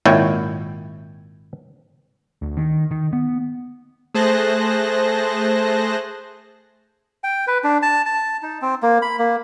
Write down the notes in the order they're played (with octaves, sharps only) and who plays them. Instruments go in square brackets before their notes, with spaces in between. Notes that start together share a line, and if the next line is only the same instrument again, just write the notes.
[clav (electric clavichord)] G#1 A#2 E4 C#5 G5
[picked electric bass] D2
D#3
D#3
B3
[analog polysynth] A3 G#4 C5 A5 F#6 A#6
[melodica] G5
B4
D4
A5
A5
D#4
C4
A#3
B5
A#3